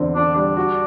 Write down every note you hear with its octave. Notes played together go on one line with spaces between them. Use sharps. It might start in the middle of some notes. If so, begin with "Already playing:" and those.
Already playing: E2 D3 C4
D3 D4
G3 D4
F#4